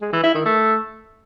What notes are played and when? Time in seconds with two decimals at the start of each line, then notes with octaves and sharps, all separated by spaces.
0.02 G#3
0.13 E3
0.24 E4
0.35 D#3
0.46 A3